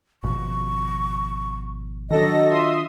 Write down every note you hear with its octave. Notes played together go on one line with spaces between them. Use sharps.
G#1 B2 F3 C#6
D#3 F#3 D4 F#4 A4 D#5 A#6
F4 E5 C6 D#6